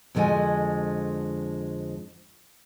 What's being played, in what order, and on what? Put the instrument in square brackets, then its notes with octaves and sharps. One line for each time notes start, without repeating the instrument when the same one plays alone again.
[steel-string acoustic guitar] F2 D3 F3 G#3 F#4 G#5